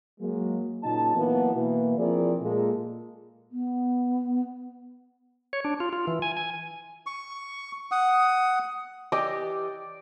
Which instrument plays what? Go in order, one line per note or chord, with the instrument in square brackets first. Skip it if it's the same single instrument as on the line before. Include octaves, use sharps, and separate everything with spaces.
[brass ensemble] F#3 G#3 A#3
A#2 C#3 F#3 D#4 A5
E3 F#3 A#3 B3
B2 E3 A#3
F3 C4 E4 G#4 A#4 D5
A#2 G#3 A#3 A4
[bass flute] B3
[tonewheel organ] C#5
D4
F4
F4
E3
G#5
G#5
[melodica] C#6
F#5 D#6
[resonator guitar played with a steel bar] E3 G4 D#5 [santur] D5